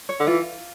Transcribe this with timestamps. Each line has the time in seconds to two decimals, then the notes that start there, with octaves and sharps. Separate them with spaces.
0.09 C#5
0.20 D3
0.27 E3 F4